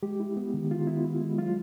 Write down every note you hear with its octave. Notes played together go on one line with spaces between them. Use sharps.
G#3 G4
E4
B3
D#3
D#3 F4
B3 E4
E4
G#3
F#3 F4